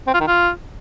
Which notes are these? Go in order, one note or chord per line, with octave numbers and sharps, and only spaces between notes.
C4
F4
D#3
F4